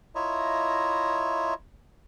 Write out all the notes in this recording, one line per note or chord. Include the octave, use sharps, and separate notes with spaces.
E4 F4 C#5 D#5 E5 A#5